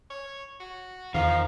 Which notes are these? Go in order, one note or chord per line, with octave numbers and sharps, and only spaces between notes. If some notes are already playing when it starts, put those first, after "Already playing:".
C#5
F#4
E2 D#3 F3 F5